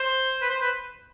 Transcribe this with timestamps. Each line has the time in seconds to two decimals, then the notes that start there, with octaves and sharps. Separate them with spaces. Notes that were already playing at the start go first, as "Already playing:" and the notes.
Already playing: C5
0.42 B4
0.50 C5
0.61 B4